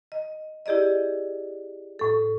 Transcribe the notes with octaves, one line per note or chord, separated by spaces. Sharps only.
D#5
E4 G4 G#4 D5 D#5
A2 A4